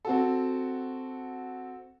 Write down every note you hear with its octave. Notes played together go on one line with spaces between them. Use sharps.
C4 F#4 A4